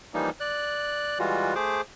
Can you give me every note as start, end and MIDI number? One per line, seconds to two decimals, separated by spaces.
0.14 0.30 52
0.14 0.30 53
0.14 0.30 55
0.14 0.30 58
0.14 0.30 63
0.40 1.19 74
0.40 1.19 90
1.19 1.54 52
1.19 1.54 55
1.19 1.54 56
1.19 1.54 65
1.19 1.54 66
1.55 1.81 57
1.55 1.81 68
1.55 1.81 72
1.55 1.81 86